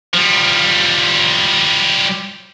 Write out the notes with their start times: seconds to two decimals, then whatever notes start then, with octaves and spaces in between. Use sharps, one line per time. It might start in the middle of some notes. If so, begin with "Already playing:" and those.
0.14 F3 G3